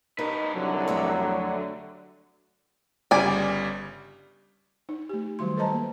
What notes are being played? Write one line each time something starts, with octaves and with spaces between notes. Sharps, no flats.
G#2 D#4 A#4 B4
C2 D3 F#3
F2 A3 C4
G1 C#3 G3 D5 G#5
D#4
A3 G4
D#3 F#3 G3 F#4 C6
A4 B4 C5 D#5 A5 A#5
A#3